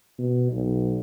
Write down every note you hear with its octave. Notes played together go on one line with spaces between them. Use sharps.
B2
B1